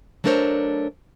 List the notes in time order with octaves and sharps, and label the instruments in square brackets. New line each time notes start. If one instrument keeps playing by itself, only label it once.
[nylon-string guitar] F#3 A3 D4 A#4 C5 C#5